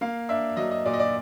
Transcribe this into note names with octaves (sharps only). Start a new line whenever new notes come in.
A#3 F5
D4 E5
F#3 D#5
D#5
A#2 D5
D#5
D5